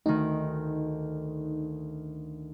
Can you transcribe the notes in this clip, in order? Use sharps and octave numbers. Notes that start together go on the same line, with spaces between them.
D2 D#3 D#4